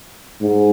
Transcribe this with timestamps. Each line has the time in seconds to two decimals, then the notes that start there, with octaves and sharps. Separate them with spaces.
0.42 G#2